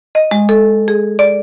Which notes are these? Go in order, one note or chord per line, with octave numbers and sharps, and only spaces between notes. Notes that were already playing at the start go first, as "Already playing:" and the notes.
D#5
G#3
A4
G#4
D5